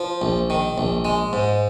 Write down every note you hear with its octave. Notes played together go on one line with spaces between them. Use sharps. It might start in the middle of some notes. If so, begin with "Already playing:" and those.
Already playing: F3
A#1
D#3
A#1
G#3
G#2